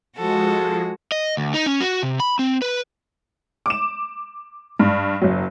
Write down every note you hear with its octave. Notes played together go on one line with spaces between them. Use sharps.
F3 G#3 F#4 A4
D#5
D2
D#4
C#4
F#4
C3
B5
C4
B4
D6 E7
G2
F#1 F#3